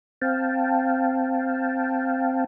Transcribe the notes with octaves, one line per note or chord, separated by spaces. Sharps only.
C4 F5 G5 A5